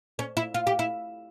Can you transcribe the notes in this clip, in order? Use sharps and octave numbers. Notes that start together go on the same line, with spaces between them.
C#4
E4
F4
G4
E4